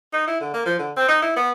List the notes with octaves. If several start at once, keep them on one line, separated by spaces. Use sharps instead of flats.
D#4
E4
D3
A#3
F3
D3
C4
D#4
E4
B3